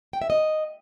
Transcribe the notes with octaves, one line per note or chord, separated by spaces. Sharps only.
G5
E5
D#5